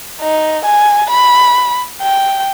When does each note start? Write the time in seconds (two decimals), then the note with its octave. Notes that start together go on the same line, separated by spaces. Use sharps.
0.22 D#4
0.66 G#5
1.10 B5
2.02 G5